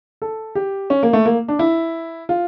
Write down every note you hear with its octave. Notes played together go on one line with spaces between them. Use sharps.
A4
G4
C#4
A#3
A3
A#3
D4
E4
F4